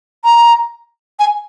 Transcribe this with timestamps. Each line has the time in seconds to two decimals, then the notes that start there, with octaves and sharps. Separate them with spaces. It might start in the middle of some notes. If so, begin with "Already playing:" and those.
0.24 A#5
1.19 G#5